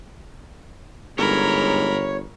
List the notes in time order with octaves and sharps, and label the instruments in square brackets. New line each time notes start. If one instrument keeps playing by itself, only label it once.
[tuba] G1 [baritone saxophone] G#2 [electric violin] A#4 B5 [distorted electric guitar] C#5